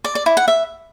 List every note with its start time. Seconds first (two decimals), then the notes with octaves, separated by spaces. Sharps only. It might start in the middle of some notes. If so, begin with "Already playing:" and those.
0.05 D5
0.15 D5
0.26 E4
0.37 F#5
0.48 E5